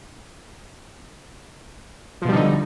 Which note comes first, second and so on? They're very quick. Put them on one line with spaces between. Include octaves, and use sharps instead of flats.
F3 B2 G3 D3 D#4